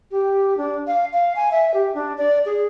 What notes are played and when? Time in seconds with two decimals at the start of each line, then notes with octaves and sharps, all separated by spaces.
0.11 G4
0.57 D4
0.87 F5
1.13 F5
1.36 G#5
1.52 E5
1.74 G4
1.94 D4
2.18 D5
2.46 G#4